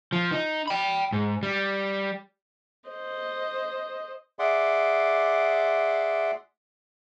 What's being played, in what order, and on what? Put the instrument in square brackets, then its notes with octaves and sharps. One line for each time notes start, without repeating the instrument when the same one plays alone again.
[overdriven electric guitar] F3
D#4
G5 B5
G#2
G3
[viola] C5 D#5
[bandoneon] G#4 D5 E5 F#5 C6 D6